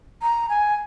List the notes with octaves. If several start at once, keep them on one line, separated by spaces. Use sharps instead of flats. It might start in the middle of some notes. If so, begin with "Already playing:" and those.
A#5
G#5